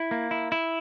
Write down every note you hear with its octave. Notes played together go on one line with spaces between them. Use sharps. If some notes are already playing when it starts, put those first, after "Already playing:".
Already playing: E4
A#3
E4
E4